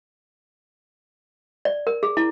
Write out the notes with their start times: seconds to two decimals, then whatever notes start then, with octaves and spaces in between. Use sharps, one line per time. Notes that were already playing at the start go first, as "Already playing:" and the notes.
1.65 D5
1.87 A#4
2.03 G#4
2.17 E4